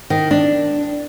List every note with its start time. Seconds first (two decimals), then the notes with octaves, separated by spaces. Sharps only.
0.10 D#3
0.31 D4